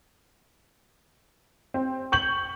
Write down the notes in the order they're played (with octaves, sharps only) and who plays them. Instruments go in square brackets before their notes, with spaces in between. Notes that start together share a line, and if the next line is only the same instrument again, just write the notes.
[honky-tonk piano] C4
C#6 G6 F#7